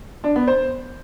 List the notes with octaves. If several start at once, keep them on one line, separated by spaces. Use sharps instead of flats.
D4
B3
C5